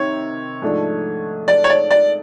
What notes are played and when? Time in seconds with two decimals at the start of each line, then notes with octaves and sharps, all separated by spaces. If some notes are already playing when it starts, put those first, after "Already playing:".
Already playing: C3 D#3 C#5
0.62 G#2 F3 A3 D4
1.48 D5
1.64 C#5
1.70 D5
1.91 D5